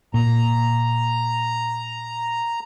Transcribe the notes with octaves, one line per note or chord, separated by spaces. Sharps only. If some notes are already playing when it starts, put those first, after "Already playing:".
A#2 A#5